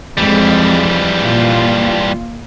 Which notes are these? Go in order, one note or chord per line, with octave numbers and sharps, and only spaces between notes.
F2 E3 G3 G#3
A#2 F4